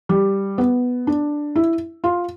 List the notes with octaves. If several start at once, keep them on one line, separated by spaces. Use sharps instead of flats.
G3
B3
D4
E4
F4